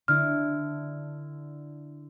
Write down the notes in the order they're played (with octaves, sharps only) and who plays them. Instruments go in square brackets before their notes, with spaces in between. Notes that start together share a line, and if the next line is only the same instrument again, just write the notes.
[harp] D3 D4 E4 [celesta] F6